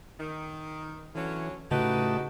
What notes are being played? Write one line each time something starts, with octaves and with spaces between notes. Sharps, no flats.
D#3
D3 E3 F#3 C#4
A2 C#3 D#4 F#4 G4 B4 D#5 A5